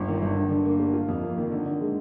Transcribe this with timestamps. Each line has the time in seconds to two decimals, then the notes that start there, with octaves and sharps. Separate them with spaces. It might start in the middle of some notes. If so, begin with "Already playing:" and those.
Already playing: G1
0.08 D#3
0.22 G2
0.36 D3
0.51 D3
0.65 A#3
0.79 G3
0.94 F4
1.08 F2
1.22 A#3
1.37 D#3
1.52 D3
1.66 D3
1.81 G#3